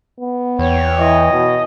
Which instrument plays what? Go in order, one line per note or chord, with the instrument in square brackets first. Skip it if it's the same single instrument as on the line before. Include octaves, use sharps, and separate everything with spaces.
[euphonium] B3
[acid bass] E2 [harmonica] C#5 G5
[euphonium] E3 [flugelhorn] D#5
[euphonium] B2